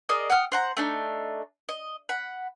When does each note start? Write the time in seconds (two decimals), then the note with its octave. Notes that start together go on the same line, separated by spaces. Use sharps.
0.09 G#4 A#4 D5 D#5
0.30 F#5 G5 D#6 F6
0.52 C5 F#5 A#5
0.77 A3 D4 D#4
1.69 D#5
2.09 F#5 B5